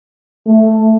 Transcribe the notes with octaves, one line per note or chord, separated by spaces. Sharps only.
A3